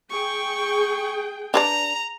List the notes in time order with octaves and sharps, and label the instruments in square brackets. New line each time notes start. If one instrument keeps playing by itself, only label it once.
[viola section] G#4 G5 [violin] C#6
[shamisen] D4 B4 D5 [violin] A#5